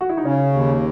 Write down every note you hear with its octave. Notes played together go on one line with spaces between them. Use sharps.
F#4
E4
D#4
C#3 C#4
D#2